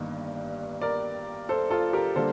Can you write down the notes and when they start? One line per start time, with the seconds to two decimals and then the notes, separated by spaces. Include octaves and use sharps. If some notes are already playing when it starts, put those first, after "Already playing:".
Already playing: G1 G2 D#3 A#3
0.82 A#4 D5
1.49 A4 C5
1.70 F4 A4
1.93 G4 A#4
2.16 D3 G3 A#3 A4 C5